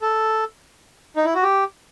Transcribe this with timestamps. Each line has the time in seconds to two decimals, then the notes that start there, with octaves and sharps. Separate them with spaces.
0.02 A4
1.16 D#4
1.25 E4
1.35 F#4
1.43 G4